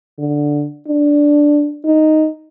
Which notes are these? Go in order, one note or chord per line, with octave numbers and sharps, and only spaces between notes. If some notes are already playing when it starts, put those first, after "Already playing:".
D3
D4
D#4